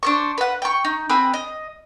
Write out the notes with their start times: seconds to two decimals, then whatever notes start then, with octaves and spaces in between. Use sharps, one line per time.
0.03 D4 C5 C#6
0.38 B4 F#5
0.62 G5 C#6
0.84 D#4
1.09 C4 G#4 F#5 B5
1.34 D#5